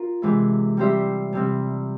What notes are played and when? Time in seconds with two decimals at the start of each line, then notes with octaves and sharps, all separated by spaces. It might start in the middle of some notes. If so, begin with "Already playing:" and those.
Already playing: F4 A#4
0.22 C3 E3 G#3 E4
0.77 G3 C4 G4 C5 E5
1.33 C3 G3 C4